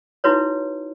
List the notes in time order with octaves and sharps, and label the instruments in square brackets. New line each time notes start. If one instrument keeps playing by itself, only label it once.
[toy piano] D#4 E4 F#4 B4 C#5